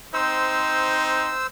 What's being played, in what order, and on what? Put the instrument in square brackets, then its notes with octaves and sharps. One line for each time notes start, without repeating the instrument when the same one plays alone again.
[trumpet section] C4 D#4 [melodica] C5 E6